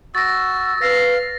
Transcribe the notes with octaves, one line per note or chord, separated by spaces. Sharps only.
F#4 E6 A6 A#6
B4 F5 A#6